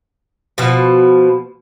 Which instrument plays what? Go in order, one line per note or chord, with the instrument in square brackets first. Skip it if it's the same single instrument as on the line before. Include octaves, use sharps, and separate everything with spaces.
[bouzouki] B2 F3